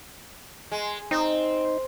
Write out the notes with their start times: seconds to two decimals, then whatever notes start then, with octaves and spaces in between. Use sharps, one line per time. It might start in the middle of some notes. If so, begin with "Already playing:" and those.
0.72 G#3
1.11 C4 D#4